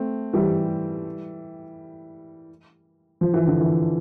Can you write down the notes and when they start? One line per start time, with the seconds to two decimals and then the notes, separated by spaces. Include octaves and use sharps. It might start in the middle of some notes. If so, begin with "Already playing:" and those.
Already playing: A3 C4
0.33 E3 G3
3.21 F3
3.34 E3
3.47 D3
3.61 E3